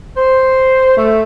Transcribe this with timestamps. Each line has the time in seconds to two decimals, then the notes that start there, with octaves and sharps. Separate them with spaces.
0.16 C5
0.96 A3